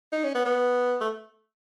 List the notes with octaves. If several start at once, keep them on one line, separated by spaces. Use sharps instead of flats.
D#4
C#4
B3
B3
A3